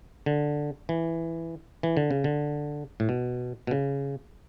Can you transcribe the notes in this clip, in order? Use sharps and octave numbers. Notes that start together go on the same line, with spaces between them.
D3
E3
E3
D3
C#3
D3
A2
B2
B2
C#3